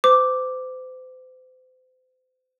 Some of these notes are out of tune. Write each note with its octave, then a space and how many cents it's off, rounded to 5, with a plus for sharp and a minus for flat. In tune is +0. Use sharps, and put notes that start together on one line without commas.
C5 -40 D6 +0